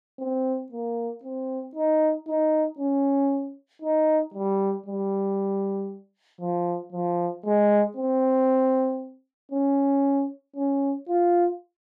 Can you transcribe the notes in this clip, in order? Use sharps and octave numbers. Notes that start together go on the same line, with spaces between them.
C4
A#3
C4
D#4
D#4
C#4
D#4
G3
G3
F3
F3
G#3
C4
C#4
C#4
F4